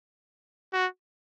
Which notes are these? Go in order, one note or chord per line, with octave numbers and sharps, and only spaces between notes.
F#4